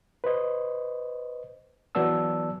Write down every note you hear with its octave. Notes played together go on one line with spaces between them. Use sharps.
B4 C5 D#5
E3 F#3 B3 D5 A5 E6